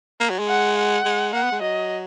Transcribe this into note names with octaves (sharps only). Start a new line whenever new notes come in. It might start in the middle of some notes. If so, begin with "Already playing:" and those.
A#3
F#3
G#3
F#5
F#5
G#3
A#3 F#5
B3
G#3
F#3 D#5